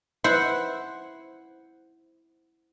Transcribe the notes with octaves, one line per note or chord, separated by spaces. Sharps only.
E4 C5 F#5